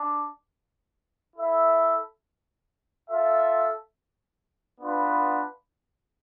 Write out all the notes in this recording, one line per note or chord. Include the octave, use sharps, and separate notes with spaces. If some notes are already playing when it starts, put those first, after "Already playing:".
Already playing: D4
E4 A4 E5
F4 A4 E5
B3 D4 F4 B4